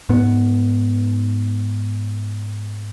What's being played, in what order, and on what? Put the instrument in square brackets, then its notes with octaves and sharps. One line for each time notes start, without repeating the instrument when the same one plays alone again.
[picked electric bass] G#2 B3